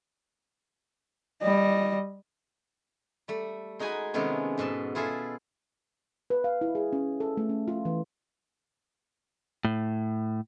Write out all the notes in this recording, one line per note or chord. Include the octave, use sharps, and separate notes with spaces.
G3 D#5
G3 A3
G#3 D#4 F#4 G#4 G#5 B5
C3 D#3 G#3 A3 B3 C#4
G#2 B2 E5 A5
E4 F4 G#4 A4 E5
B4
F5
E4
G#4
C#4
A4
A3
C#4
F4
E3
A2